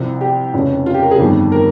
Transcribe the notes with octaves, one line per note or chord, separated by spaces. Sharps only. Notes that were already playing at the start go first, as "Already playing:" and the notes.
Already playing: C2 C3 F3
G4
F1 F2 C#3
F4
G4
A#4
G#4
G1 F2 D#3 G3
A#4